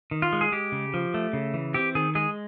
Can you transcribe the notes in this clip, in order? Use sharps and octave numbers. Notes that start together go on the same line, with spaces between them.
D#3
F4
G#3
G#4
G#3 G4
C#3
F3
A3
C#3
E3
C4 G4
D#3 G#4
G#3 G#4